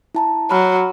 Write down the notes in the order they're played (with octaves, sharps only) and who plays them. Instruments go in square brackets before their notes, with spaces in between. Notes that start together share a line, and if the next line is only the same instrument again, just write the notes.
[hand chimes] E4 A5 A#5
[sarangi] F#3 [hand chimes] B5 F6